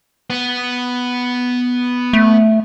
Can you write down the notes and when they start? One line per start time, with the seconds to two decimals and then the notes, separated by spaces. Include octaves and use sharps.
0.30 B3
2.13 A3